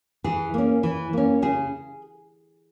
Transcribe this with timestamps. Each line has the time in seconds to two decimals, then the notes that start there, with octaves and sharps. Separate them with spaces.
0.24 E3 G#4
0.54 A#3 C#4
0.83 E3
1.13 A#3 C#4
1.42 C#3 G#4